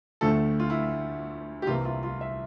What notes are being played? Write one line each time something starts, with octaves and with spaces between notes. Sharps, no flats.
D2 D3 F3 A3 A4
F4
E4
G4
C2 C3 E3 A#3 F4
F4
F4
E5